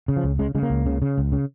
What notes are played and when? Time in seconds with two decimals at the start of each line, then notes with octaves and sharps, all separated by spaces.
0.08 C#3
0.17 F3
0.24 C#2
0.39 C#3 G#3
0.55 C#3 G#3
0.63 A#3
0.70 C#2
0.86 C#3
1.02 C#3
1.18 C#2
1.32 C#3